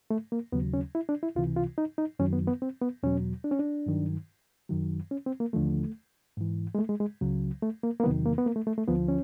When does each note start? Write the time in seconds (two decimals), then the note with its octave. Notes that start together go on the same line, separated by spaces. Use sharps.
0.10 A3
0.32 A#3
0.52 D#2 C#3 F#3 B3
0.74 C#4
0.95 E4
1.09 D4
1.23 E4
1.35 C#2 C3 E3 F4
1.56 F4
1.78 D#4
1.98 D#4
2.19 F#2 D#3 F#3 C#4
2.33 B3
2.47 B3
2.62 C4
2.82 B3
3.03 E2 B2 F#3 C#4
3.44 D4
3.51 C#4
3.59 D4
3.86 G2 D#3 F#3
4.69 F#2 D#3 F#3
5.11 C#4
5.26 C4
5.40 A#3
5.53 D#2 D3 F3 A3
6.37 G#2 E3
6.75 G#3
6.78 A3
6.89 G#3
7.00 G#3
7.21 C#2 C#3 F#3
7.63 A3
7.83 A#3
8.00 A#3
8.04 E2 C3 D#3 F#3 B3
8.26 A#3
8.38 B3
8.46 A#3
8.56 A3
8.67 A3
8.78 A3
8.88 D2 D3 F3 B3
9.08 C#4